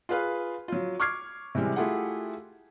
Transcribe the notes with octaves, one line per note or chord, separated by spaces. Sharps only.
F4 G#4 B4 F5
F#3 F4
C#6 D6 F6 G#6 C7
C3 E3 G3 G#3
A3 E4 F4 G4 G#4 F#5